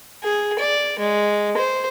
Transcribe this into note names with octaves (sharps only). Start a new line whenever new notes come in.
G#4
D5
G#3
C5